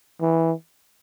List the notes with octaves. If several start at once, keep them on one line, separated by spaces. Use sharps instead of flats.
E3